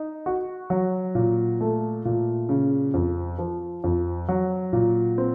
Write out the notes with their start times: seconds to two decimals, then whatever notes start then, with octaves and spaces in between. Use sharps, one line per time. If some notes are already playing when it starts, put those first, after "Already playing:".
Already playing: D#4
0.26 F#4
0.70 F#3
1.15 A#2
1.61 A3
2.05 A#2
2.49 C#3
2.94 F2
3.38 F3
3.84 F2
4.28 F#3
4.73 A#2
5.18 C4